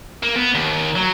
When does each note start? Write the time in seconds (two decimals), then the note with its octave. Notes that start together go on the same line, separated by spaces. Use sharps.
0.23 A#3
0.36 B3
0.55 D#2
0.96 F#3